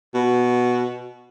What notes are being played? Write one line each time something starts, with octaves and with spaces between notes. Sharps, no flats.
B2